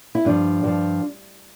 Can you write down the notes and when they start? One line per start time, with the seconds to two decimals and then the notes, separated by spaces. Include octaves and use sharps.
0.15 E4
0.25 G2 F3 D4
0.64 G2 F3